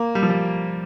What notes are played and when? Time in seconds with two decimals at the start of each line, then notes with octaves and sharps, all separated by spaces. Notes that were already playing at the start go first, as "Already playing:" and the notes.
Already playing: A#3
0.15 G3
0.23 F3
0.30 G3